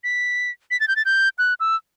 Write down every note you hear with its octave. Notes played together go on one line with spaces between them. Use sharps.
B6
B6
A6
G6
A6
G6
F#6
E6